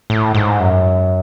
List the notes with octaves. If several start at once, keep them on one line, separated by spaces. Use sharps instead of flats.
A2
G#2
F#2